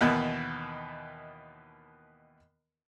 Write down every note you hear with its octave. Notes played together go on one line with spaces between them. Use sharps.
D#2 B2 D#3 E3 B3